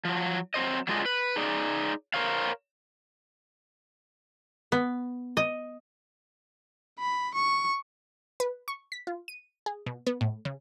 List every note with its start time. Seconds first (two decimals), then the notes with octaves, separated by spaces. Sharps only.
0.05 F3 F#3
0.54 F#3 C4 C5 D#5
0.88 F#3 G#3 D4 F4 G#4 D#5
1.06 B4
1.36 D#4 G#4 D5
2.14 A#4 C5 C#5 F5
4.72 B3
5.37 D#5
6.99 B5
7.35 C#6
8.40 B4
8.68 C#6
8.92 B6
9.07 F4
9.28 D#7
9.66 G#4
9.86 B2
10.07 B3
10.21 A2
10.45 C#3